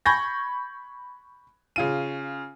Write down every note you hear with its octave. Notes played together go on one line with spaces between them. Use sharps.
B5 C#6 G6 G#6 A#6
C#3 F4 D#7